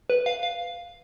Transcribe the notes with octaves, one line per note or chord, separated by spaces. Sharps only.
B4
F5
F5